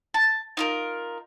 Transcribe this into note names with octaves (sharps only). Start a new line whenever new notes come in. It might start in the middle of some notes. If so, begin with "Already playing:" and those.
A5
D#4 F4 A#4